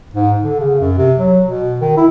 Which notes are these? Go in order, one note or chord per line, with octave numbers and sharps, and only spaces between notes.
G#2
D3
C#3
F#2
C3
F#3
B2
D#3
E4